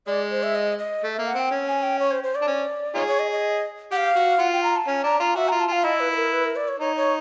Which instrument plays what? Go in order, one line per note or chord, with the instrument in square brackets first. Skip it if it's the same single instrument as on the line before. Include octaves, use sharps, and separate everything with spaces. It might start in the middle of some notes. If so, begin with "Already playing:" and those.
[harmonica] G#3 [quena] D5
[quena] C5
E5
D#5
D#5
[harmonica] A3
[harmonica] A#3 [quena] E5
[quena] F#5
[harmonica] C4 [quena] G5
[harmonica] C#4
[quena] G#5
G5
C#5
C5
C5
D5
[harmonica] D4
C#4
[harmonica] D#4 F4 G#4 [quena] C#5
[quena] C#5
D#5
D#5
[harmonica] G4 [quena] F#5
[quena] F5
[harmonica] F#4
[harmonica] F4 [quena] F#5
[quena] G5
A#5
A5
[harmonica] C#4 [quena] G#5
[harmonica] D4 [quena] A#5
[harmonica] F4 [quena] A#5
[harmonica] F#4 [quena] E5
[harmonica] F4 [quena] A#5
[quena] A5
[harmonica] F4 [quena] F5
[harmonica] E4 [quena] D#5
[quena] B4
B4
A#4
B4
A#4
D5
C#5
[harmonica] D#4 [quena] C#5
[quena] C#5